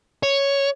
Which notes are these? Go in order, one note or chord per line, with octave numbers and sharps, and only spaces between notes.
C#5